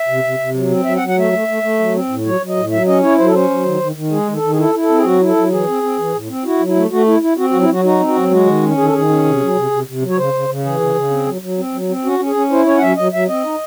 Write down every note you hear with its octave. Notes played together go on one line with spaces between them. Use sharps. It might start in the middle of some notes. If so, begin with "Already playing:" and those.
Already playing: E5
C3
C3
C3
F#3
C4
F#3 E5
F#5
F#3
F#5
A3 E5
A3
A3
A3
F#3
C4
A2
F#3 C#5
F#3
D#5
A2
F#3 E5
C#4 D#5
E4 C#5
F#3 C5
A4
C#4 C5
F#3
D#3
D#3
D#3
G#3 G#4
D#3
A4
D#3
G#4
E4 A4
E4
A4
C4
G#4
F#3 F#4
E4
A4
F#3
E3 G#4
C4
C4
E3
A2
C4
E4 F#4
F#3
E4
A3
A3 F#4
E4
E4
C4 F#4
F#4
F#3
E4
F#3 F#4
D#4 F#4
C4
F#4
F#3
G#3 F#4
D#3
C#4
D#3 G#4
A4
D#3 G#4
C#4
C3
F#3
C3
C3
C3
F#3
C#5
C#3 C5
C#3
C#3
E3 G#4
C#3
C#3
C4
F#3
F#3
C4
F#3
C4
C#4 F#4
C#4
G#4
C#4
E4 C5
C#4 C#5
F#5
F#3 E5
F#3 D#5
F#3 E5
C4 D#5
D#4